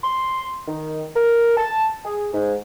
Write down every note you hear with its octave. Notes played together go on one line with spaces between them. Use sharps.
C6
D#3
A#4
A5
G#4
G#2